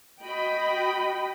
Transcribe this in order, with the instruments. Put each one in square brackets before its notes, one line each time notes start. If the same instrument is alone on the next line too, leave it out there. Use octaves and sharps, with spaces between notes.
[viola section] F#4 D#5 G5 B5